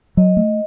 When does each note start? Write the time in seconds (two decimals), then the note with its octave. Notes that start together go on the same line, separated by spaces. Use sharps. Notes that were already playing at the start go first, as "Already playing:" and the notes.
0.17 F#3 D#5
0.37 A3